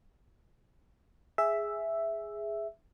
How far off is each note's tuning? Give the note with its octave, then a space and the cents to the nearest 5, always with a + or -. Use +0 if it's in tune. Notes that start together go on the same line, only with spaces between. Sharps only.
G#4 +0 E5 +0